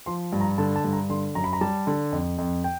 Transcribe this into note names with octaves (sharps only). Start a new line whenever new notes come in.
F3 C6
G2
A#5
D3 A5
A5
G2
A#5
D3 C6
F#2 A#5
B5
A#5
G3 A5
D3
F2
F2
G5